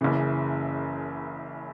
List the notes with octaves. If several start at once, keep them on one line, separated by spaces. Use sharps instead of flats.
F#1 F#2 C#3 E3